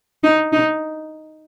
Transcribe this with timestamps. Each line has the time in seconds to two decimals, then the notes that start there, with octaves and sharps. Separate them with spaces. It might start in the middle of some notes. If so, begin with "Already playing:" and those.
0.24 D#4
0.53 D#4